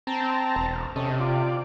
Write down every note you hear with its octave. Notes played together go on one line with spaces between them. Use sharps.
C4 A5 A#5
E1
C3 C#4 A4 D#5
F4 D5